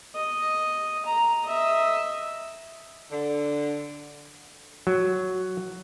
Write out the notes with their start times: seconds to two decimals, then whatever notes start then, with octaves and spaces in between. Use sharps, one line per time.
0.15 D#5
1.06 A#5
1.44 D#5 E5
3.12 D3
4.87 F#3